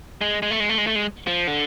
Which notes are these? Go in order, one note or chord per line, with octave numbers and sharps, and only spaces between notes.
G#3
G#3
A3
G#3
A3
G#3
A3
G#3
F3
D3